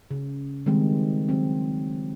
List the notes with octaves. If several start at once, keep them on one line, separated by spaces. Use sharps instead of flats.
C#3
D#3 G3 G#3 C4
D#3 F#3 C4